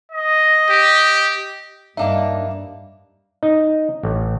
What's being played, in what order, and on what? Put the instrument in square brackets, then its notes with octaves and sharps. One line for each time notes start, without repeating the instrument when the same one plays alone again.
[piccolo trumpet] D#5
[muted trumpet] G4
[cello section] G2 [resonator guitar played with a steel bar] A#3 D4 D#4 [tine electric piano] E5 F5
[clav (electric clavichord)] D#4
A1